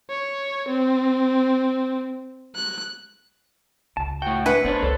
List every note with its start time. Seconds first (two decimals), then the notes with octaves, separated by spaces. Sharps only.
0.10 C#5
0.68 C4
2.55 F#6
3.97 C#2 A5
4.22 A2 F#4 G5
4.46 D4 B4 E5 F#5 G#5
4.65 A3 B3 D4 C5 C#5 B5
4.82 C#2 A4